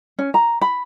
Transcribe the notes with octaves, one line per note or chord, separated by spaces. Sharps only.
C#4
A#5
B5